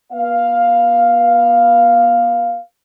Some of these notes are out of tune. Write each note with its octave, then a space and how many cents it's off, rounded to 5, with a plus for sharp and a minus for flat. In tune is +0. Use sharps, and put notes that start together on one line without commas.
B3 -35 F5 +0